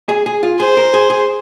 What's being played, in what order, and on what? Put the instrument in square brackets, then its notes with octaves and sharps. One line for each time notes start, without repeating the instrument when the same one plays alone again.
[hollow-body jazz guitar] G#4
G#4
F4
[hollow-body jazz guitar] G#4 [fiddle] C5
[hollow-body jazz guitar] A#4
G#4
G#4